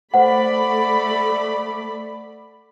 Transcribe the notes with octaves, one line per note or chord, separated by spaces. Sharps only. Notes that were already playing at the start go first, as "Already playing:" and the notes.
A3 C5 D5 F#5 B5